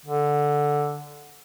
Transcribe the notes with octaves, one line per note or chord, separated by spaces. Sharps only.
D3